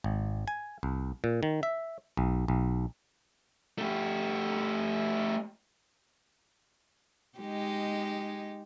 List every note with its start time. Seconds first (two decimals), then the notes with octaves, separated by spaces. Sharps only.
0.04 G#1
0.48 G#5
0.83 C2
1.24 A#2
1.43 D#3
1.63 E5
2.17 B1
2.48 B1
3.78 A3 G4
7.39 G#3 D#4 G4